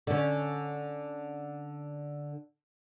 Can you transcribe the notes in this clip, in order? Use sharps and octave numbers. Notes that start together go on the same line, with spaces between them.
D3 C#4